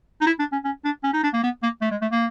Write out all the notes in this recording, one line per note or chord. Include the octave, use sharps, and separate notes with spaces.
D#4
E4
D4
C#4
C#4
D4
C#4
D#4
D4
A#3
B3
A#3
A3
G#3
A3
A#3